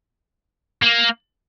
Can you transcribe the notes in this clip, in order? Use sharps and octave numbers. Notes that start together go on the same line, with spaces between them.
A#3